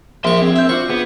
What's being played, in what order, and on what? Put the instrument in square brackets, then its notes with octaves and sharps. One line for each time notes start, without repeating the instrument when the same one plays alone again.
[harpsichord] A#1 C#6 [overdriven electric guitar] E5 C6 [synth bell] G7
[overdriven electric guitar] C4 [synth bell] G#4
[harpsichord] E5 [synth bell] E6 G6
[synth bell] D4 F4 C5 [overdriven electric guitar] F#4 [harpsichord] C#6
[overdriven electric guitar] B3 [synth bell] G#4